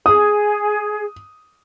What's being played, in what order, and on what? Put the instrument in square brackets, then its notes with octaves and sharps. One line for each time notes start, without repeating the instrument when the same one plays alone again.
[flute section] G#4 [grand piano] D#6